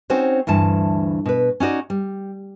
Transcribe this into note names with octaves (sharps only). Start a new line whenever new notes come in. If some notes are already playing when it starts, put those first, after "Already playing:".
C4 C#4 D#4 F#4 C5 C#5
D2 G2 E3 A5
B2 B4
C#4 D#4 F#4 D5
G3